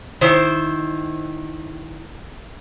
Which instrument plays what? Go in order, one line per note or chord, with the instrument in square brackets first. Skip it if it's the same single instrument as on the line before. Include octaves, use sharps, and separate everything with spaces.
[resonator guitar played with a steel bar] D#3 E4 C5